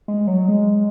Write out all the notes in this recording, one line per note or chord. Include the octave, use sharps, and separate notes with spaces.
G#3
F#3
G#3